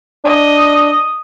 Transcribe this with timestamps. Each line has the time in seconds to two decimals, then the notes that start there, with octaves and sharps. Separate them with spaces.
0.24 D4 D#5